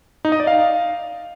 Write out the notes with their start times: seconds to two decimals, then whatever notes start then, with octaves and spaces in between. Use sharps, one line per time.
0.25 D#4
0.32 D#5
0.40 D5
0.47 F5